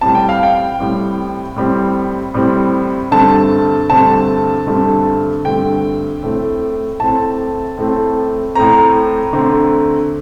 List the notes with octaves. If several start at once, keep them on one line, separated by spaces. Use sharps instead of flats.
A2 G3 C4 A5
G5
F5
G5
A2 G3 C4
A2 G3 C4
A2 G3 C4
G2 D3 A3 C4 A5
G2 D3 A3 C4 A5
G2 D3 A3 C4
G2 D3 A3 C4 G5
A2 A3 C4
A2 A3 C4 A5
A2 A3 C4
A2 A3 C4 A#5
D3 A3 C4